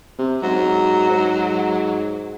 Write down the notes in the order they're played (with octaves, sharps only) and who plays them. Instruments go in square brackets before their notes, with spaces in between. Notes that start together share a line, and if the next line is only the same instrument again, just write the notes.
[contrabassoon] C3
[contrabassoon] G#2 [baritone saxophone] F#3
[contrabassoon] G#2